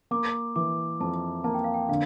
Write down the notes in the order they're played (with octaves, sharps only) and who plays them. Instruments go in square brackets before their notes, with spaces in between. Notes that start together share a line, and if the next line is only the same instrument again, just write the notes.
[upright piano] A#3 [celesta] D6
[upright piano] E3 [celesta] D6
[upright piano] F2 [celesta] A5
[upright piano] A#3 [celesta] A5
[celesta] G5
F5
G5
[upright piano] D3 [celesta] F5